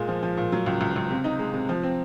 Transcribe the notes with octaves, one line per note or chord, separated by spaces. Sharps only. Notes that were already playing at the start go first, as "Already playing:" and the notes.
Already playing: A#2 G#3
F3
F3
A#2
F#3
C#2
C#2
C#2
C3
D#4
G#3
C3
F3
C4